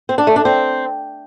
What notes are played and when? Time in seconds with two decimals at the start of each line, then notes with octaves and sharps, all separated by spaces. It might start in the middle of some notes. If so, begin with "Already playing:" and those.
0.09 C4
0.18 D4
0.27 A3
0.36 D4
0.45 C4